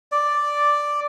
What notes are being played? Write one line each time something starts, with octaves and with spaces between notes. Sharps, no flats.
D5